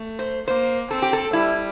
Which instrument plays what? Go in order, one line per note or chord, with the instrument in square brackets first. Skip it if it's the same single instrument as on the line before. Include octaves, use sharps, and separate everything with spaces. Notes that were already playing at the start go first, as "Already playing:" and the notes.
Already playing: [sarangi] A3
[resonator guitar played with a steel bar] C5
[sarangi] A#3 [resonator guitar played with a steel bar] C5
[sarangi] C4 [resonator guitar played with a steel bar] A4
[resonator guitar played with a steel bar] G4
A4
[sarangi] G3 [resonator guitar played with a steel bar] E4